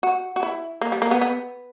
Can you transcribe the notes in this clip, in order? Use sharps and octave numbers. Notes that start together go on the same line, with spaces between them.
F#4
F#4
E4
A#3
G3
A#3
B3
B3